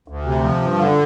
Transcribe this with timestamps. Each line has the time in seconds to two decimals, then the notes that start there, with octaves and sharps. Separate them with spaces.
0.08 D2
0.25 C3
0.43 F3
0.62 G2
0.79 D3